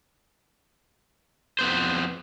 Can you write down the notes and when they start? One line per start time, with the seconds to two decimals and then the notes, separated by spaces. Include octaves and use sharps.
1.59 F2 B3 C5